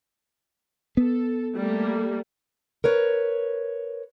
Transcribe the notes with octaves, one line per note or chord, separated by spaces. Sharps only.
B3 A4
G3 A3 A#3
A#4 B4 C#5